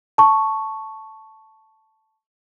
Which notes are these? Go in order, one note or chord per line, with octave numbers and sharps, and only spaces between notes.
A5 C#6